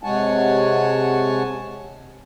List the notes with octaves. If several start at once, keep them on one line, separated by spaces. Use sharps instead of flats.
C3 G#3 C#5 F#5 G#5 A5